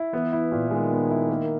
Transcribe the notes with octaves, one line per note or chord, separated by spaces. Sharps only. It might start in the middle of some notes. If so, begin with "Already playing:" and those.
Already playing: E4
E3 B3
E4
A#2
D#3 G#3
B3
E4
A#3